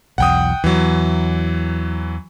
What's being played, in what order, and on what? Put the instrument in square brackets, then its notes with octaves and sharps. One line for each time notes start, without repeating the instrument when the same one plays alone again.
[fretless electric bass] B1 E2 [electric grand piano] F#5 G5 D#6
[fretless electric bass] E2 [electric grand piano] E3 F#3